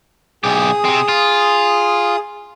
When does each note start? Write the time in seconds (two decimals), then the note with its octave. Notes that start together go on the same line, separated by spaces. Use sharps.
0.44 B1 G4 G#4 D#6
0.85 C3 C4
1.08 F4